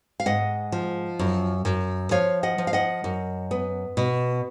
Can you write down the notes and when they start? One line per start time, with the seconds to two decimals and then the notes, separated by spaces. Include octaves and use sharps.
0.20 F5
0.26 G#2 D#5 F#5
0.72 F3
1.19 F#2
1.65 F#2
2.11 F3 C#5 F5
2.43 D#5 F#5
2.58 F3
2.67 F5
2.73 D#5 F#5
3.04 F#2
3.51 B3
3.97 B2